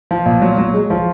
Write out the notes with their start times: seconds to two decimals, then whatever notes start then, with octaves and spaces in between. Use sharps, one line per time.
0.11 F3
0.26 A#2
0.42 F#3
0.58 F#3
0.74 G#3
0.90 F3